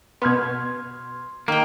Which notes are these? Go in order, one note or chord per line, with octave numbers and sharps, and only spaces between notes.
B2 B3 C6 F6 G#6
D#3 A#3 G5